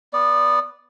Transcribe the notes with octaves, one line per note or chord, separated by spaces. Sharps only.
B3 D5